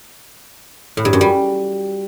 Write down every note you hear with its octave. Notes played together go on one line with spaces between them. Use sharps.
A2
G2
F#2
G3